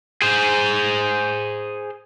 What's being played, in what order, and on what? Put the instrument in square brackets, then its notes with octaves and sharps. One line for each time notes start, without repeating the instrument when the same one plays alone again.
[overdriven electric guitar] G#4 C5